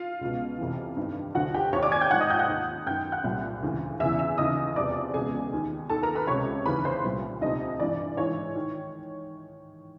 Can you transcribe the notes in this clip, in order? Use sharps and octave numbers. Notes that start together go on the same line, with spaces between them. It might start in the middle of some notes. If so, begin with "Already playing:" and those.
Already playing: F4 F5
C#2 B2
F2 C3 E3
G2 D#3
D2 D3 F3 F#4 F#5
G4 G5
D#2 D#3 C#5 C#6
D5 D6
G#5 G#6
G5 G6
G#2 F3 F#5 F#6
D#5 D#6
G5 G6
F#5 F#6
D#2 D#3
F#2 D#3 G5 G6
F#5 F#6
C2 A#2 F3
D2 C#3 E3
E2 C#3 E3 E5 E6
E5 E6
D#2 C#3 E3 D#5 D#6
E2 C3 F3 D5 D6
C#2 B2 G#4 G#5
D#2 D#3
D#2 D#3 A4 A5
A#4 A#5
B4 B5
C#2 C3 F3 C#5 C#6
D#2 C#3 E3 B4 B5
C5 C6
C2 A#2 F3
D2 C3 F3 D#4 D#5
G2 E3 D5
G#2 E3 C#5
D#3